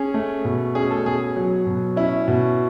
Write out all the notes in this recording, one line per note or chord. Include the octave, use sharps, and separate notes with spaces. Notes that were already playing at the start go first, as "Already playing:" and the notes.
Already playing: C#4 G#4
A3
B2
C#4 G#4
A4
B2 G#4
F#3
B2
C#4 E4
B2